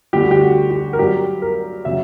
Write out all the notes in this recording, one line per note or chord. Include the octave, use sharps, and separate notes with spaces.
D2 D3 G3 G4
F#4
G4
F#4
G4
A#4
G2 F#3 G4
A#4
C#3 F#3 E5